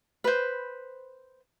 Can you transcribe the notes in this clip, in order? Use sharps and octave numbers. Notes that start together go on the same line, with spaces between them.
B4 C5